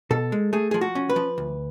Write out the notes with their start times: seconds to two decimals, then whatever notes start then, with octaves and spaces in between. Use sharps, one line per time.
0.11 B2 A4
0.32 G#3
0.53 A3 G#4
0.71 F3 G#4
0.81 F#4
0.95 C#4
1.09 B4
1.16 F3
1.38 D2